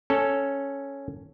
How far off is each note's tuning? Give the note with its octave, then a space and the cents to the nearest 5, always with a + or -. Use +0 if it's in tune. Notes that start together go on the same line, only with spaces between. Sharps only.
C#4 +0 A4 +0